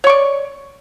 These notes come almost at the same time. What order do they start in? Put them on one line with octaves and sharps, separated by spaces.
C#5 C#6 D5